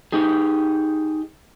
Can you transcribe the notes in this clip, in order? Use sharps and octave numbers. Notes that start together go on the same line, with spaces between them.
D#4 G4 G#4